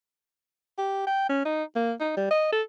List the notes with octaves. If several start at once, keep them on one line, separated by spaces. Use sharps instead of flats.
G4
G5
C#4
D#4
A#3
D#4
G3
D#5
A4